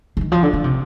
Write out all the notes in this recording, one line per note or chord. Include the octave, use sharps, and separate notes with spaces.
D3
D#3
F3
D3
D3
C3